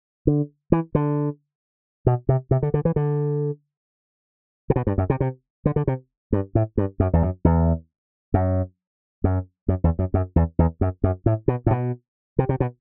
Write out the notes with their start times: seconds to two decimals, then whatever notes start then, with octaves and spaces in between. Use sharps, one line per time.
0.27 D3
0.72 E3
0.95 D3
2.07 B2
2.29 C3
2.51 C3
2.63 D3
2.74 D3
2.85 E3
2.96 D3
4.70 C3
4.76 B2
4.87 G2
4.98 F#2
5.10 C3
5.20 C3
5.66 D3
5.76 D3
5.87 C3
6.33 G2
6.55 A2
6.77 G2
7.00 F#2
7.13 E2
7.22 F#2
7.45 E2
8.34 F#2
9.24 F#2
9.68 F#2
9.84 E2
9.99 F#2
10.14 F#2
10.36 E2
10.59 E2
10.81 F#2
11.04 F#2
11.26 A2
11.48 B2
11.66 A2
11.70 B2
12.39 C3
12.49 C3
12.60 B2